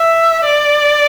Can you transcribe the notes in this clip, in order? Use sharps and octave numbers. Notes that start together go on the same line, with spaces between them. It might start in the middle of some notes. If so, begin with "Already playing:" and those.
Already playing: E5
D5